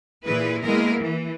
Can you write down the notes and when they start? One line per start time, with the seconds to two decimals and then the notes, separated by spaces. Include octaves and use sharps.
0.25 A#2 E3 E4 G#4 B4
0.63 G#3 A#3 B3 E4 G#4 A#4
1.00 E3